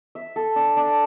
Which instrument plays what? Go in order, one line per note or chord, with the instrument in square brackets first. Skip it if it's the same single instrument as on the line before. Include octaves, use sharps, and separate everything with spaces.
[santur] E5
A4
D4
D4